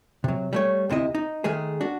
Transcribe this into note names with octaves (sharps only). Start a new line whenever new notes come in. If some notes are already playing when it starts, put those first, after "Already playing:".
C3 F#3
G3 A3 C#5
D2 C3 E4 D#5
D#4
D#3 G#3 A3 G#4
D4 F#4